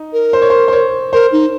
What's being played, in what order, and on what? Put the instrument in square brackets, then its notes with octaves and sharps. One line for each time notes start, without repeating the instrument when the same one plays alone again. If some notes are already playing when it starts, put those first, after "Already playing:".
Already playing: [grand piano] D#4
[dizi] A#4
[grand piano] C5
C#5
C5
C5
C#5
[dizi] A#4 [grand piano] C5
[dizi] D#4